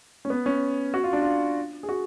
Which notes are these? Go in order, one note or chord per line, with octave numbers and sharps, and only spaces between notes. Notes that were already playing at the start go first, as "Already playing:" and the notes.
C#4
B3
C#4
F#4
F4
D4
F4
G#4
F#4